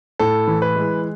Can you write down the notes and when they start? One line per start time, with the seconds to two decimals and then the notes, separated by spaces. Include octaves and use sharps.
0.19 A2 A4
0.48 E3
0.62 B4
0.75 G#3